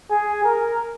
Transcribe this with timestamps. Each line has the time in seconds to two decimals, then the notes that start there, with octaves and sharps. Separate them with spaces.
0.10 G#4
0.44 A#4